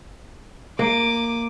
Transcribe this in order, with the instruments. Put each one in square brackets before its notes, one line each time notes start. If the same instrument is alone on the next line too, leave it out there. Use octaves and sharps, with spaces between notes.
[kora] A#3 [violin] D6 D#7